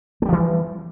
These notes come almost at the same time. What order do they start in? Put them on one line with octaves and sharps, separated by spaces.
A3 G3 F3 E3